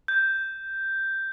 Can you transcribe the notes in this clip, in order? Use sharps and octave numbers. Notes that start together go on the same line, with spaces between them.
G6